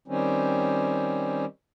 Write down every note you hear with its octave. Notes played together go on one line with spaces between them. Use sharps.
D#3 G3 C4 C#4